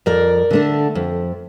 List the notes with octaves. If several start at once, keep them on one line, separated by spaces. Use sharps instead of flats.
F2 A#4 D5
D3 A3 D4
F2